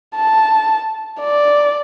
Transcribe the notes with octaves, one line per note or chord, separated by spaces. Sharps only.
A5
D5